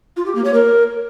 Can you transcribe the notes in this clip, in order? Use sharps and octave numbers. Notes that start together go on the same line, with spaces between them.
F4
G4
A#3
C#5
A#4